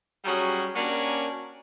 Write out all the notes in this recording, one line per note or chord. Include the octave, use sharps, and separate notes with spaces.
F#3 G3 C#4 F#4 G#4
A#3 C#4 D4 F#4 G4 A#4